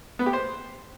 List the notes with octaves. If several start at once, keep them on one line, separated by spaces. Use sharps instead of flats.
B3
G4
C5